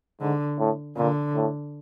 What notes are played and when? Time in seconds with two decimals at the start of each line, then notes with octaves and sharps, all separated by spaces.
0.21 G#2 D3
0.59 A2
0.97 A#2 D3
1.35 A2